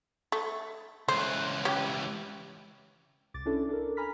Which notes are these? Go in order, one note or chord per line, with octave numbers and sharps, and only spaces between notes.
A3
C#2 E3 C5
G3 C#4 G4
C2 D6 A6
C#4 D4 E4 A4
D4 A4 A#4
G#5 A#5 B5 F6 B6